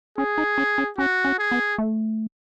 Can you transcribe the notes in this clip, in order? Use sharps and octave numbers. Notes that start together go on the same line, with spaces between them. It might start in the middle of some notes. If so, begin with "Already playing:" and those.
C#4 G#4
D#4
C#4
C#4
C#4 F#4
C#4
G#4
B3
A3